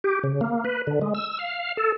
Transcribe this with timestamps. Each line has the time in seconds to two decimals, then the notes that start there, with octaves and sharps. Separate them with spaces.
0.04 G4
0.24 C#3
0.41 A#3
0.65 B4
0.87 D3
1.01 G#3
1.14 E6
1.39 F5
1.77 A4